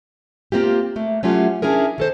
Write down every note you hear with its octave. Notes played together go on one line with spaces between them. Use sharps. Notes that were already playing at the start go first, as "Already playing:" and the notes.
A#3 C4 F4 G4
A3 A#3
F#3 A3 C#4 E4 F4 G4
C#4 D4 E4 G#4 A#4
D#3 A4 C5